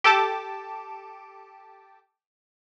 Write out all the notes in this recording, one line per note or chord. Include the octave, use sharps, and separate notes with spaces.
G4 A4 A5 D6